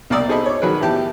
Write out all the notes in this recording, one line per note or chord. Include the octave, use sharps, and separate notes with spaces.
C2 A#3 A#4 D5 D#6 E6
C4 D#4 G#4 A4 D#5 B5
C#5 D6
D#3 F#3 G#4 B4
A2 E3 G4 A5